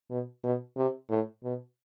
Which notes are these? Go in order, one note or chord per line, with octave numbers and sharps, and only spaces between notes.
B2
B2
C3
A2
B2